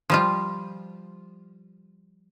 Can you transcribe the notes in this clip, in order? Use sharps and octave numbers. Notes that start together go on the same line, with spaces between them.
F3 G3 F4